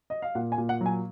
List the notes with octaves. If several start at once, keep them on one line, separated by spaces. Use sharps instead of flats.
D#5
F5
A#2 F#5
G#5
A#2
F#5
F#3 G#5